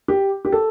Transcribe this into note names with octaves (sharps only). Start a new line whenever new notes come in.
G4
G4
A4